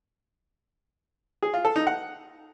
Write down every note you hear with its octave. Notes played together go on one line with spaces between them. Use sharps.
G#4
F4
A4
D#4
F#5